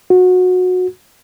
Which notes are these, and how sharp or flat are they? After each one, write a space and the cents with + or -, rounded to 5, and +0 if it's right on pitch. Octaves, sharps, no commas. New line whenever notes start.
F#4 -20